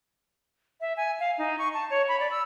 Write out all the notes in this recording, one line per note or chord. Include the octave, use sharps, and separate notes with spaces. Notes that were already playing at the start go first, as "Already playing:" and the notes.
E5
G#5
F5
D#4
C#6
A5
C#5
B5
D5
E6